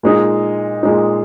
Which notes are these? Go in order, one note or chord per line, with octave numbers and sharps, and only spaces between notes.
A#2 G#3 D#4
A#2 G#3 D#4